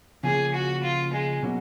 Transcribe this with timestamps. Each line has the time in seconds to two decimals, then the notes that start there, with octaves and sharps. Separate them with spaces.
0.24 C#3 F3 A#3 C#4 G#4
0.54 F#4
0.83 F4
1.13 G#3
1.42 B2 F#3 A#3 C#4 F#4